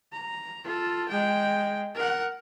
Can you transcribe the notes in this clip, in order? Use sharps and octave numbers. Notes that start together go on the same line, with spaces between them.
A#5
F4 A4
G#3 G5
A#4 F#5